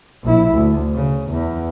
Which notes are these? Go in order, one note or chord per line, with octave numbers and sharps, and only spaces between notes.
A#1 E4
D2
C#3
E2